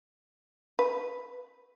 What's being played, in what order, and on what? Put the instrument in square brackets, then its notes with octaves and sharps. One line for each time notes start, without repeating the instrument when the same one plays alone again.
[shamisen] B4